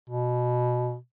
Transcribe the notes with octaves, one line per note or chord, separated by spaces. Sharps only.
B2